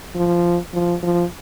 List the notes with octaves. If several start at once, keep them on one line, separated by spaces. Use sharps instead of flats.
F3
F3
F3